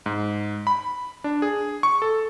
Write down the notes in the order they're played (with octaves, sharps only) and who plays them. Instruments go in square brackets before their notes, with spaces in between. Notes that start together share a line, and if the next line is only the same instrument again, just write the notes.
[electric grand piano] G#2
B5
D4
G#4
C#6
A4